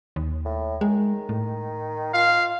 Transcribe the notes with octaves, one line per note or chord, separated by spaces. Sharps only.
D#2
A2
D#3 G#3
A2
F4 F5